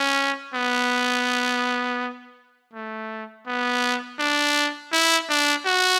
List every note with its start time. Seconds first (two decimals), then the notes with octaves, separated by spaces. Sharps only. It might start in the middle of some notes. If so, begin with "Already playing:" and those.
Already playing: C#4
0.54 B3
2.73 A3
3.47 B3
4.19 D4
4.92 E4
5.29 D4
5.65 F#4